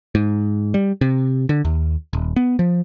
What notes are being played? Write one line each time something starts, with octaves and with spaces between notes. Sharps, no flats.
G#2
G3
C3
D3
D#2
D#1
B3
F3